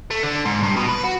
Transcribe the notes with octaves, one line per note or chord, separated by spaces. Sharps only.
A3
D3
G#2
G2
B2
B4
F#4